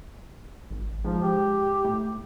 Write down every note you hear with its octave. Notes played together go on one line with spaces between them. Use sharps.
G#1
G#2 F3
G4
A2